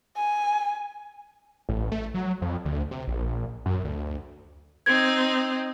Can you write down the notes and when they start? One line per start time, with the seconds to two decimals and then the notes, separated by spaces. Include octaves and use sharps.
0.16 G#5
1.69 A1
1.92 A3
2.14 F#3
2.42 F2
2.65 D2
2.91 C3
3.07 A#1
3.66 F#2
3.84 D2
4.86 C4 D#4 G#6